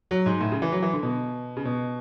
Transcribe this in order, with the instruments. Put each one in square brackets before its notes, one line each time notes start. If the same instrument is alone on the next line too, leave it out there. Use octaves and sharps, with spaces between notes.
[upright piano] F#3
G#2
A2
C#3
E3
F#3
E3
D3
B2
C#3
B2